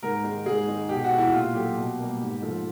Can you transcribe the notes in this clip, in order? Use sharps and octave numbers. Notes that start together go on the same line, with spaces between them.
G#2 A#4
D#3 G#3
G#2 G#4
D#3 G#3
B2 G4
F#4
G#3
E4
A#2 F4
F#3 A3 G4
B2
G3 A#3
G#2
F3 A3